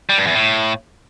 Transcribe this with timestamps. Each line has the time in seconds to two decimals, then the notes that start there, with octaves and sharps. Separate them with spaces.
0.10 G3
0.18 G2
0.27 E2
0.35 A2